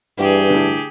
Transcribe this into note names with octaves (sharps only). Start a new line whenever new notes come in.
G2 E3 G4 G#4 G5
A2 D3